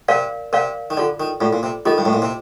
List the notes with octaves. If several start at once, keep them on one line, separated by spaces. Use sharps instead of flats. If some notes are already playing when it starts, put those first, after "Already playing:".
C3 A#4 D5 F5
C3 A#4 D5 F5
D#3
D3 F4 A4 D5
D#3
A2 F4 A4 D5
A#2
C3
D#3 F4 A4 D#5
G2
A2
A#2
C3